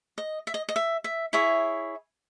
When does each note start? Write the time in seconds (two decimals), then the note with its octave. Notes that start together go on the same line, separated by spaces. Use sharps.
0.18 D#5
0.47 E5
0.54 D#5
0.69 D#5
0.76 E5
1.04 E5
1.33 E4 G#4 C#5 E5